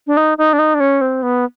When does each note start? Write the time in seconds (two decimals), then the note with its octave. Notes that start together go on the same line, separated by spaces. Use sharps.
0.07 D4
0.17 D#4
0.38 D#4
0.53 D4
0.59 D#4
0.74 D4
0.80 C#4
1.01 C4
1.23 B3